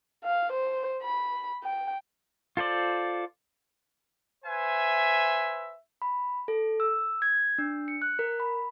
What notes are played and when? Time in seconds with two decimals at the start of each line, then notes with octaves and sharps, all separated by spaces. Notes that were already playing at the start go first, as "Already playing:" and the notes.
0.24 F5
0.53 C5
1.03 B5
1.64 G5
2.57 F4 A4 C5 D5
4.45 B4 C5 E5 G#5
6.02 B5
6.48 A4
6.80 E6
7.22 G#6
7.58 D4
7.88 C#7
8.02 F#6
8.19 A#4
8.40 B5